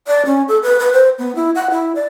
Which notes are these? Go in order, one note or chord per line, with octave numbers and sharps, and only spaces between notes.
D5
C#4
A4
B4
B4
C5
B3
E4
F#5
E4
D5